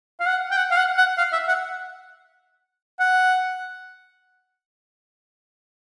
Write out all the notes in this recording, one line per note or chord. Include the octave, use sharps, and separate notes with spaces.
F5
F#5
G5
F#5
F5
F#5
F#5
F5
E5
F#5
F#5